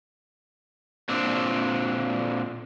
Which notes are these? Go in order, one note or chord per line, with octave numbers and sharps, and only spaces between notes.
A#2 C4 D4